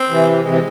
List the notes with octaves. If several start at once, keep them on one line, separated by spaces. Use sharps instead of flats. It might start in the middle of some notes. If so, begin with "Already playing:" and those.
Already playing: C4
C3 E3
C3 E3 G#3